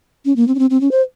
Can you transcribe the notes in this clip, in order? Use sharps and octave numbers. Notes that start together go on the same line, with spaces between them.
C#4
A#3
C4
C#4
C4
C4
C#4
C5